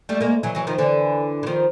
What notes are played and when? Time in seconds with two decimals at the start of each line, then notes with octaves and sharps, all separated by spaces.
0.09 G3 A3
0.21 G#3 A#3
0.43 E3 F#3
0.55 E3 F#3
0.67 D#3 F3
0.78 D3 E3
1.43 E3
1.47 D#3 F3